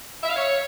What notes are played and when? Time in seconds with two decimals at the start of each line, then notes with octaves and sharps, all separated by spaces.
0.23 E5
0.30 F5
0.36 C#5